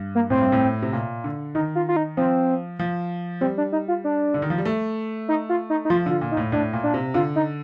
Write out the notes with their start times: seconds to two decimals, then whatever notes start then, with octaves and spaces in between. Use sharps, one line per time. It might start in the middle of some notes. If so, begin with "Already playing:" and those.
Already playing: G2
0.15 A#3
0.30 A2 C4
0.41 G2
0.52 A2
0.82 C3
0.93 A#2
1.24 D3
1.55 D#3 D#4
1.75 F4
1.89 F4
1.96 D#4
2.17 F3 C4
2.79 F3
3.41 G3 C4
3.58 D4
3.72 D#4
3.88 F4
4.04 D4
4.34 D3
4.42 D#3
4.50 F3
4.58 G3
4.65 A3
5.29 D#4
5.49 F4
5.70 D#4
5.85 D#4
5.90 F3 F4
6.06 D3 F4
6.21 A#2
6.32 D#4
6.37 A2
6.52 A2 D4
6.73 A#2
6.83 D4
6.94 C3
7.14 D3 F4
7.36 D#4